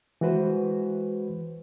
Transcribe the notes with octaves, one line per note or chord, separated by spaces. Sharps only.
E3 G#3 F#4 B4 C5